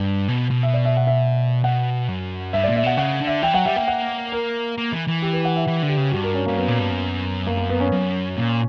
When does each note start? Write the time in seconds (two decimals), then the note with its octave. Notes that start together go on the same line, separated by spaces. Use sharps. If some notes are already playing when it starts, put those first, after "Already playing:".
Already playing: G2
0.28 B2
0.51 B2
0.63 E5
0.74 D5
0.85 E5
0.97 F#5
1.07 E5
1.64 B2 F#5
2.08 F#2
2.53 G2 E5
2.64 A#2 D5
2.76 E5
2.84 B2 F#5
2.97 C#3 F#5
3.21 D3
3.27 E5
3.43 E3 G5
3.54 F#3 F#5
3.66 G3 E5
3.76 A#3 G5
3.88 F#5
4.32 A#4
4.78 A#3
4.92 E3
5.07 E3
5.22 G4
5.33 B4
5.45 F#5
5.56 E5
5.67 E3
5.82 D3
5.89 G4
5.98 C#3
6.12 G2 F#4
6.23 A#4
6.34 C#4
6.46 G2 A#3
6.57 F#2 B3
6.68 A#2
6.79 G2
6.90 F#2
7.47 A#3
7.57 A#3
7.70 B3
7.80 C#4
7.92 F#2
8.37 A#2